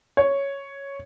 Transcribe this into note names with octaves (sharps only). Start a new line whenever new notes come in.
C#5